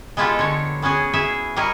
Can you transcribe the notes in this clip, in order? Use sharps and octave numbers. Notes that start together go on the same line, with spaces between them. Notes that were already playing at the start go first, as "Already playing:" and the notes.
G#3 B3 E4 F4 G4 A4
D3 C#5
B3 C#4 F#4 G#4
E4 G#4 E5
G3 E4 A#4 C#5 D#5